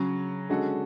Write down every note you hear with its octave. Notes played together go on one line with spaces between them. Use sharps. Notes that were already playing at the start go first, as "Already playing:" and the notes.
Already playing: C#3 F#3 C#4
D3 G#3 C#4 F#4 A4